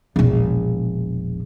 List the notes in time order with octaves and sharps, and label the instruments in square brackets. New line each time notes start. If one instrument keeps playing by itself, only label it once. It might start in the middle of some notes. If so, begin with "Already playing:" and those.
[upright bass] E1 A#1